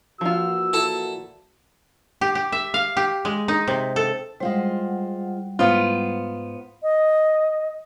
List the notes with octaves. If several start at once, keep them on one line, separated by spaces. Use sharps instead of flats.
A#2 E3 F3 F4 F#4 E6
E4 A4 A5
G4
G4
E5
F5
G4
G#3
D#4
C3
A4
G3 G#3 F4 C5 F#5
G#2 B3 F4 C5 F5
D#5